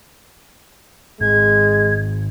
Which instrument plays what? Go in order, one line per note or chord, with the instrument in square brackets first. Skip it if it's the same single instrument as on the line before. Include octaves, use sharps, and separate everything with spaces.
[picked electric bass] G#1 [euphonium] G#3 [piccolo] G#6